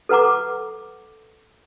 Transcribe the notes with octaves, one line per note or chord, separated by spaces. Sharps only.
A4 B4 F#5 A#5 D6